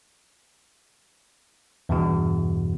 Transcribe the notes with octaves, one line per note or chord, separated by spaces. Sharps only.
E2 G2 B2